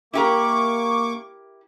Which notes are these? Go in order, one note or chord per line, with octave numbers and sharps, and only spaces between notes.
A#3 E4 G4 A#4 C#6 D6